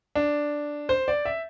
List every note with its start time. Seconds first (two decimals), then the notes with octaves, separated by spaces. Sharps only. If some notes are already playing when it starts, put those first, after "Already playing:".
0.15 D4
0.89 C5
1.08 D5
1.25 E5